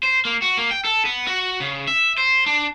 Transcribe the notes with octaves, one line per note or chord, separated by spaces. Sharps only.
C5
A#3
F#4
A#3
G5
A4
B3
F#4
C#3
E5
C5
D4